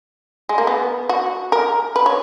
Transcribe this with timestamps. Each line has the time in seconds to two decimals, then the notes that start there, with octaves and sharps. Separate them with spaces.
0.49 G#3
0.58 A#3
0.67 B3
1.09 F#4
1.52 A#4
1.96 B4
2.06 C#5